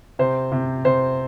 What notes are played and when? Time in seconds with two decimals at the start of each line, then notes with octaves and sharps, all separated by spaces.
0.19 C3 C5
0.52 C3
0.85 C3 C5